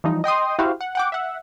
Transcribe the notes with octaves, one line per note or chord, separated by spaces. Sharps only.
E3 F3 G3 D#4
D#5 G5 C6 D#6
E4 F#4 G4 C5 F5
F#5
F#5 G5 D6
E5 F#5